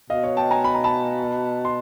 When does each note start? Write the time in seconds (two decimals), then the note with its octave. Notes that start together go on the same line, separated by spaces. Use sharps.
0.10 B2 D#5 F5
0.24 C#5 D#5
0.37 G5 A5
0.51 G#5 A#5
0.64 B5
0.74 A#5
0.84 A5 B5
1.65 C6